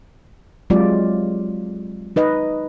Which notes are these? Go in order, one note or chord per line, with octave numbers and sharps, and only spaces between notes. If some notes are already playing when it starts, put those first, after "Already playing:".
F#3 G#3 C4 F4 G4 D5
D#4 B4 D#5